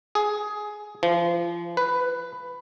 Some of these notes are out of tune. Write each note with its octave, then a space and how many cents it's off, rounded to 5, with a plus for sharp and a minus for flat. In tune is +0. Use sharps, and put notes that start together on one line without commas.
G#4 +15
F3 -30
B4 +10